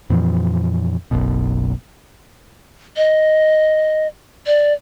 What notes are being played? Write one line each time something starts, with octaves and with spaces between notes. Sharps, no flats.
F2 A#2 E3 F3
F#1 B1 F#2 B2
D#5
D5